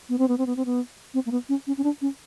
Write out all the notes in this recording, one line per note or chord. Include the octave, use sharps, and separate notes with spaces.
B3
C4
B3
C4
B3
C4
B3
C4
A#3
B3
C#4
C#4
C#4
D4
C#4